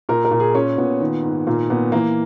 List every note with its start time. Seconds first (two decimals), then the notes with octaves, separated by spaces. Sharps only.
0.09 A#2 A#4
0.25 A#4
0.31 A#2
0.40 G#4
0.55 A#2 C#4
0.78 A#2 B3
1.00 D#3
1.23 G#2
1.47 A#2 A#3
1.70 A#2 B3
1.92 E3 A#3